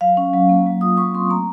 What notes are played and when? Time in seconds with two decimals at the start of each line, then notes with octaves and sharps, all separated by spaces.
0.01 F#3 F5
0.17 C#4
0.34 F#3
0.49 A#3
0.66 F#3
0.81 F4 D#6
0.97 F#3 C#6
1.13 C4 C6
1.30 A3 A#5